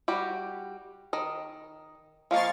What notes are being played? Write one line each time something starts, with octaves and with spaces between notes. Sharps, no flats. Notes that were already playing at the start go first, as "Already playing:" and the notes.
G3 F#4 G4
D#3 D#5
F3 G#3 A#3 F5 C#6 A6